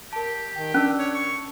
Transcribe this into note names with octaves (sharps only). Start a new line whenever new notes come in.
G4 A#4 A5
D#3 G5
C#4 D4 A#4 E6
C#5
C#6